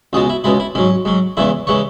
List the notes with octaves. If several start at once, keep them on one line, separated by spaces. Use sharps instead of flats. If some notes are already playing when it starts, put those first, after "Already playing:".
C#2 B2 G#3 G#4
E4
C#2 B2 G#3 E4
E4
G#2 F#3 C#4
G#2 F#3
E2 C#3 E3 G#3 E4
C#3 E3 G#3 C#5